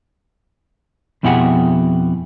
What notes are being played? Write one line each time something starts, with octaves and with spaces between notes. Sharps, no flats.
F2 B2 E4 G4 G#4 F#5